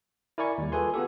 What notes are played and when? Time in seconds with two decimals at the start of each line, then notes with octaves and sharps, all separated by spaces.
0.38 E4 A#4 D5 G#5 C#6
0.58 D#2 G3
0.72 F4 G#4 A4 B4 G#5 C6
0.94 B3 F4 G4 A4